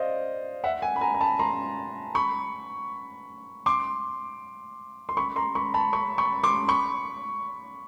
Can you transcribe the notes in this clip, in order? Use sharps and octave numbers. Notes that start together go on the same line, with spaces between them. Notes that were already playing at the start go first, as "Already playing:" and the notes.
Already playing: C5 D5 D#5 F5
E5 F#5
F#5 G#5
B5
G#5 A#5
A#5
A5 B5
A#5 C6
B5 C#6
C6 D6
C6
B5 C#6
A#5 C6
B5 C#6
A5 B5
B5 C#6
B5 C#6
C6 D6
B5 C#6